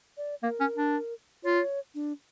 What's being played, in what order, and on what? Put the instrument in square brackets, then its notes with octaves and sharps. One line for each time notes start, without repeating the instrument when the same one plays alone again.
[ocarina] D5
[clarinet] A#3 [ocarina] A#4
[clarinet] C#4
D4
[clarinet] F4 [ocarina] C#5
[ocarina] D4